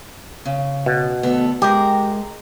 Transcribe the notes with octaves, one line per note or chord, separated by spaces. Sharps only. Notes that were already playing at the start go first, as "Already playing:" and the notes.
C#3
B2
D2 B3 A4
G#3 G4 A#4